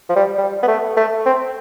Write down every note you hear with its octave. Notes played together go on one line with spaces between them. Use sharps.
F3
G3
G3
B3
A3
A3
C4